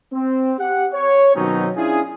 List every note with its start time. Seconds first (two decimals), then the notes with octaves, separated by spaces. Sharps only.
0.13 C4
0.59 G4 F#5
0.93 C#5
1.35 B2 D#3 F#3 C4 C#4 D#4
1.76 C#4 D4 E4 F4 G#4